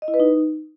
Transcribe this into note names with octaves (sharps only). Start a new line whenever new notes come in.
D#5
E4
B4
D#4